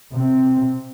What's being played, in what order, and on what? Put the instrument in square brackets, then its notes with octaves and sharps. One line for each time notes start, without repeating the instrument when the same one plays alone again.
[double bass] C3 C4